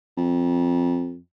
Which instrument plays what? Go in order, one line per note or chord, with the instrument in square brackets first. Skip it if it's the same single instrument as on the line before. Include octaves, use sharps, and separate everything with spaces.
[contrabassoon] F2